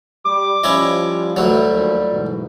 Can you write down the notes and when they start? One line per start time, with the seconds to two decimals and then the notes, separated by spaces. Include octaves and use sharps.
0.26 G3 D6
0.64 F3 G3 C#4 E4 D#5
1.36 D2 E3 F#3 G3 A3 F#4
1.70 D#2 F3
2.12 G#2 B2 E3